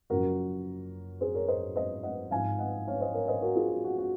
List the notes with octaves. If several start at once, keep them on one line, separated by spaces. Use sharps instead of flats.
F#1 F#2 F3 F#4 A#4
G#4 C5
A#4 C#5
C5 D#5
C5 D#5
D#5 F#5
G#1 G#2 F3 F5 G#5
D#5 F#5
C#5 F5
C5 D#5
A#4 C#5
C5 D#5
F#4 A#4
F4 G#4
F#4
F#4
F#4